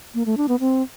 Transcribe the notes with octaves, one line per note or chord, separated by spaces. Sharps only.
A#3
A3
D4
B3
C4